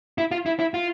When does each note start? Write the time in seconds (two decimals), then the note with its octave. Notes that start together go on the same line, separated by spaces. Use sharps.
0.18 E4
0.31 F4
0.46 E4
0.59 E4
0.74 F4